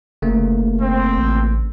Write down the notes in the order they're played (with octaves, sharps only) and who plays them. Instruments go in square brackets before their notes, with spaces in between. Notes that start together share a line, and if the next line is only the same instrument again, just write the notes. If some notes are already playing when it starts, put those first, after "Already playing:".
[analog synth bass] F#1 [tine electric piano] C#3 A3 A#3
[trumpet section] C4
[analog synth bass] A1